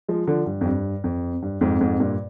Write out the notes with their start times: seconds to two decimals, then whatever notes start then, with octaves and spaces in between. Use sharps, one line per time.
0.08 F3 G#3
0.27 D3 F3
0.46 G2
0.61 F2
0.65 G2
1.04 F2
1.42 G2
1.61 F2 G#2
1.81 F2 G#2
2.00 G2 A#2